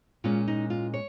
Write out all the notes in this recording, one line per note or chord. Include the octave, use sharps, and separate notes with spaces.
A#2 G#3 C#4 F4
D#4
F4
C#5